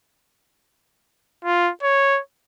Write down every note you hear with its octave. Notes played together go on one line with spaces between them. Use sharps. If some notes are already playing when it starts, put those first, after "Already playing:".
F4
C#5